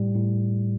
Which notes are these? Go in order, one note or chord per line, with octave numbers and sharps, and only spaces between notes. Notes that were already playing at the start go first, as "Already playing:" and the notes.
Already playing: A2 G3
A2